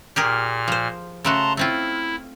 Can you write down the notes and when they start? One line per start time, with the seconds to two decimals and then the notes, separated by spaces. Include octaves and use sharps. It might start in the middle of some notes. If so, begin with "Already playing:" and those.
0.16 A#2 G4 G#4 A#4 F6
0.68 F3 C5
1.24 C#3 A3 F#4 A5 A#5 C6
1.57 A3 C4 E4 F4